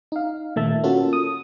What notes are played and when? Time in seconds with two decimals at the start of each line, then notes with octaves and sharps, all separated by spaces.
0.12 D#4 F5
0.56 A#2 D#3 A3 E5 A5
0.83 A#3 C#4 F4 F#4 A4
1.13 D#6